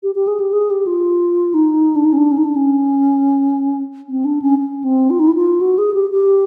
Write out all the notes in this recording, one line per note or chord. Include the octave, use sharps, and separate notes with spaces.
G4
G4
G#4
G4
G#4
G4
F4
D#4
D4
D#4
C#4
D4
C#4
D#4
D4
C#4
C4
D4
C#4
C#4
C4
F4
D#4
E4
F4
F#4
G#4
G4
G4